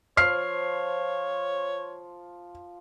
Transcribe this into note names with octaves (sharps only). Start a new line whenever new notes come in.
F3 C5 C#5 F6 C7